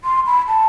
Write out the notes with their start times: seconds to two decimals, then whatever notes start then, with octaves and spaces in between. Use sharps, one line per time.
0.04 C6
0.27 B5
0.48 A5